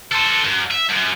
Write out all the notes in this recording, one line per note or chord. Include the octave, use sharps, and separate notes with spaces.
A4 C5
F#2
E5
F#2